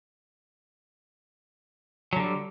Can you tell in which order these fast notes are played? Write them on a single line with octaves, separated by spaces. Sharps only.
F#3 D3 G3